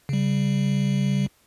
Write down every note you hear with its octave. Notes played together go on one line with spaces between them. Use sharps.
C#3 G3